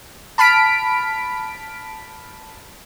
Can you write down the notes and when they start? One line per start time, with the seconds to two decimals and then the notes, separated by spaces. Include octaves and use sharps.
0.38 A5 B5 F6 B6 D7